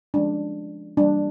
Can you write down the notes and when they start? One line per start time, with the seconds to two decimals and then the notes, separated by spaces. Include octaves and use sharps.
0.14 F3 G#3 C#4 D4
0.97 E3 G3 A#3 D4